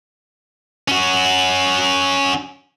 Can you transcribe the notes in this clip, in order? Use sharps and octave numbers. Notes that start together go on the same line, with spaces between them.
C#4 F#4